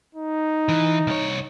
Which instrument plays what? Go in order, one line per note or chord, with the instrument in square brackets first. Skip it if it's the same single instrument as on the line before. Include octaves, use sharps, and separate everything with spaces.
[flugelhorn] D#4
[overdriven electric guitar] E3
C2 C#5